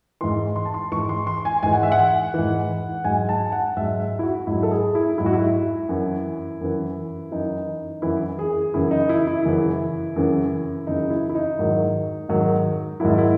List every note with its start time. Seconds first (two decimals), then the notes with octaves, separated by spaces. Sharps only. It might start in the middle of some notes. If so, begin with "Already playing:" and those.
0.21 G#2 E3 C6
0.56 C6
0.65 A5
0.74 C6
0.92 G#2 E3 C#6
1.09 C6
1.27 C6
1.45 G#5
1.63 G#2 E3 G#5
1.73 F#5
1.83 E5
1.92 F#5
2.34 G#2 E3
3.04 G#2 F#3 G#5
3.29 A5
3.52 F#5
3.77 G#2 F#3 E5
4.00 E5
4.19 E4
4.23 F#4
4.47 G#2 F#3 E4
4.63 A4
4.71 G#4
4.95 E4
5.18 G#2 F#3 E4
5.26 F#4
5.33 E4
5.89 F#2 E3
6.61 F#2 E3
7.32 F#2 E3 D#4
8.02 F#2 E3 E4
8.39 G#4
8.74 F#2 C#3 E3 E4
8.91 D#4
9.09 E4
9.27 E4
9.45 F#2 C#3 E3
10.16 F#2 C#3 E3
10.87 F#2 C#3 E3 D#4
11.10 E4
11.30 E4
11.35 D#4
11.59 G#2 D#3 F#3
12.29 G#2 D#3 F#3
13.00 G#2 D#3 F#3 E4
13.18 E4